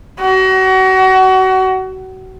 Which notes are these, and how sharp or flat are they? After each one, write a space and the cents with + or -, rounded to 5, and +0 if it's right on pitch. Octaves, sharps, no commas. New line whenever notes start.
F#4 +30